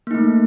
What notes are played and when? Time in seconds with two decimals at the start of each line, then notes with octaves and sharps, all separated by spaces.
0.07 A#3
0.11 D#4
0.15 A3